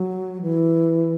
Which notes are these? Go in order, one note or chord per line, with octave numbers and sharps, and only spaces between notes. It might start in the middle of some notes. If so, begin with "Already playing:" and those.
Already playing: F#3
E3